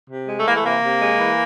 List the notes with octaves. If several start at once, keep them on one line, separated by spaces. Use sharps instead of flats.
C3
G#3
A3
E3 A#3
A3
C3 A#3
C3
G#3
E3